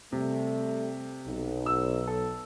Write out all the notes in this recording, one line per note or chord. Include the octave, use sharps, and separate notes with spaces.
C3 G3 A3
B1
E6
A4